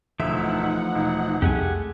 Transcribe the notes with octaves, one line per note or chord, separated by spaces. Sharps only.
E1 D2 E3 F3 A3 D#4 E5 F#5
E1
C2 F2 G#3 A3 G4 F#5 G#5